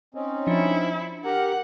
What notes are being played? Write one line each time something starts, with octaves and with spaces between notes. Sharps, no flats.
C4 C#4 D#4
F3 D4 E4 C#7
G4 A#4 F#5 A#5